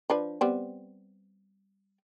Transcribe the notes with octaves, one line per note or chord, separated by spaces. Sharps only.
F3 D4 B4
G3 B3 C4